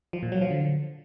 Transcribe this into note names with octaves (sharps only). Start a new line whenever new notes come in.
F3
A#2
F#3
F3
D3